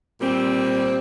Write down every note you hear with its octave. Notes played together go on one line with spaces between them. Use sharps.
A#2 G3 C4